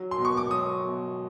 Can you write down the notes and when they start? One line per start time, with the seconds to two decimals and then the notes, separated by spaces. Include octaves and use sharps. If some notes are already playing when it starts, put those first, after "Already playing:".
Already playing: F#3
0.11 C6
0.18 B2
0.25 C#6
0.37 D6
0.51 F#3 D#6
0.84 B2